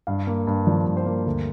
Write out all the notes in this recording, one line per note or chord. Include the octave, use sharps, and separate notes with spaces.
G2 F5
A#3
G2
F3 D5
G2
C5
A#3
D2